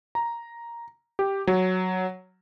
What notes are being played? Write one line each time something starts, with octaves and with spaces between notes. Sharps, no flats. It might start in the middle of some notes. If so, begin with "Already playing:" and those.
A#5
G4
F#3